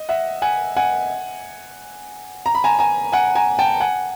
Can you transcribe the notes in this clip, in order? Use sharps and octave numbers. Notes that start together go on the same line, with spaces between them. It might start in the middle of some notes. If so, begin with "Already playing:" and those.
Already playing: D#5
E5 F#5
F#5 G#5
F#5 G#5
A#5
B5
G#5 A#5
G#5 A#5
F#5 G#5
G#5 A#5
G5 A5
F#5 G#5